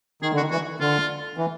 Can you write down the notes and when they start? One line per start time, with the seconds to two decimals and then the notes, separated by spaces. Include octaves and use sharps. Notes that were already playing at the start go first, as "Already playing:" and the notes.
0.22 D#3 G#4
0.32 D3
0.37 F#4
0.40 D#3
0.51 E3 F#4
0.80 D3 F4
1.37 E3